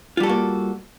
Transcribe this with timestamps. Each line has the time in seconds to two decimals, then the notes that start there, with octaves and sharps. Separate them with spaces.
0.17 F4
0.20 G3
0.23 A4
0.26 F#4
0.29 A#3